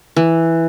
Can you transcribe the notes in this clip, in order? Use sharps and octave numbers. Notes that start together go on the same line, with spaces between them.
E3